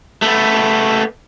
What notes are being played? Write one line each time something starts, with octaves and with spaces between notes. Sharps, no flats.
A3 B3